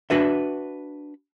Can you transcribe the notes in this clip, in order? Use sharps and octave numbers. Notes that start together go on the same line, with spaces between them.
D4 F#4 B4 E5